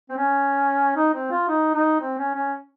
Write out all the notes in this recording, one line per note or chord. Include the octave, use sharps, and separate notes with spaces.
C4
C#4
D#4
C4
F4
D#4
D#4
C4
C#4
C#4